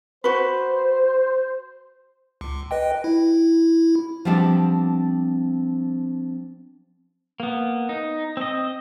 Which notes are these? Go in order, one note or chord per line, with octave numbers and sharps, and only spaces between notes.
F#4 B4 C5
C#2
B4 D#5 G5
E4
F3 G3 B3 C4 D4
A#3 B3
D#4
C4 D#5